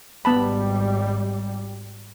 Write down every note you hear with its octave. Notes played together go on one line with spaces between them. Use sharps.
G#1 G3 B3 A5 B5